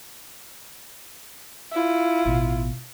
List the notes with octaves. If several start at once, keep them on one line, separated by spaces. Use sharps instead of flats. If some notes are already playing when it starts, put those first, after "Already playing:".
E4 F4
A1 B2